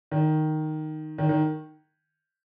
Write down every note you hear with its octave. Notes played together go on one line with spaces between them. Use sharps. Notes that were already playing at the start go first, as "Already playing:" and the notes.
D#3
D#3
D#3